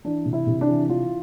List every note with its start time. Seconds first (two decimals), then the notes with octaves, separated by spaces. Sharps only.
0.05 E3 D4
0.26 C3
0.33 E4
0.47 C3
0.61 D4
0.69 E3
0.89 E3 F4